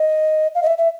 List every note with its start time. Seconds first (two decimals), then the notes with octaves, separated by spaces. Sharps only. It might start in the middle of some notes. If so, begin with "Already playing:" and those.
Already playing: D#5
0.55 F5
0.63 D#5
0.67 E5
0.78 E5